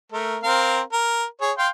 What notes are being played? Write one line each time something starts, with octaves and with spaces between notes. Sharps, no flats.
A3 A#4
C4 A#4 F5
A#4
G#4 C#5
F5 G5 C6